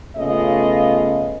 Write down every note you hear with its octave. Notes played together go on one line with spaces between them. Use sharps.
C#3 A3 B3 F4 D#5